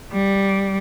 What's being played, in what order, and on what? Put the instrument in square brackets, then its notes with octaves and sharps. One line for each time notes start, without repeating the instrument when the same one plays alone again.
[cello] G3